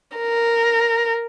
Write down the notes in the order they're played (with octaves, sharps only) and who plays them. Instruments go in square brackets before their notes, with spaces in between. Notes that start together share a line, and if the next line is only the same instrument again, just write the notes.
[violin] A#4